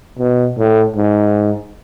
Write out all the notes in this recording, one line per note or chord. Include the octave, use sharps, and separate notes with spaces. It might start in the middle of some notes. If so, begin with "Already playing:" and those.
B2
A2
G#2